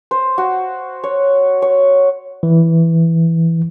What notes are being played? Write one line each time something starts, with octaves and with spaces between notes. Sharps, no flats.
C5
F#4
C#5
C#5
E3